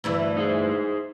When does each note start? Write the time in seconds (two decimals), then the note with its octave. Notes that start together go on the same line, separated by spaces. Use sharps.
0.04 D2 G2 E3
0.37 D#4 G#4 C5